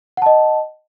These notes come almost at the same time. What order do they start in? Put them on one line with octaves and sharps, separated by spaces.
F#5 A5 D#5